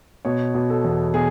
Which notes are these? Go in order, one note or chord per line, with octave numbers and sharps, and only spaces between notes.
B2 C#5
B2
A4
E2
B2 G#4